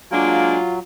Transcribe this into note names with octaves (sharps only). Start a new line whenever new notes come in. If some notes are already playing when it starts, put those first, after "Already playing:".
F#3 G#3 A#3 D4 F4